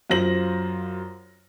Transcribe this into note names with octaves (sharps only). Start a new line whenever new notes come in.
F#2 F4 C5 A#6 F#7